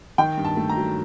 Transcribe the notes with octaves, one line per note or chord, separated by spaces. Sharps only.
D#3 G5
G2
A5
A3
A#5
F#3